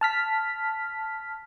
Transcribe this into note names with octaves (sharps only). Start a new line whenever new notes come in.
A5 F6 B6